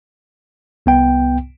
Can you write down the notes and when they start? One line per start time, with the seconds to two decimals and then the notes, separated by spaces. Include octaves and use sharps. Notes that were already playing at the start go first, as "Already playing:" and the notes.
0.86 C2 B3 G5